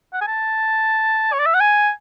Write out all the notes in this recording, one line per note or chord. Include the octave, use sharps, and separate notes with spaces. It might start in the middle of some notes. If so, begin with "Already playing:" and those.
F#5
G#5
A5
C#5
D5
E5
F#5
G#5